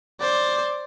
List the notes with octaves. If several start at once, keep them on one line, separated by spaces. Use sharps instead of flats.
C5 D5